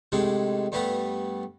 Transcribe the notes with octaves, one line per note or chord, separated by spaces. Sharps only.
A2 C3 G#3 D4 D#4
G2 G3 A3 B3 B4 A#5